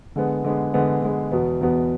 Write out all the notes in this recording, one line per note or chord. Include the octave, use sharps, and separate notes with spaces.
D3 G#3 B3
D3 G#3 B3
D3 G#3 B3
D3 G#3 B3
E2 B2 B3
E2 B2 B3